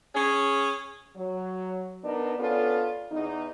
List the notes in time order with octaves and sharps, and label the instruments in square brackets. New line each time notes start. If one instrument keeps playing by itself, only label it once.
[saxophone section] C#4 G#4
[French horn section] F#3
B3 D4 D#4 A#4
B3 C#4 D4 F4 A4
E2 D#4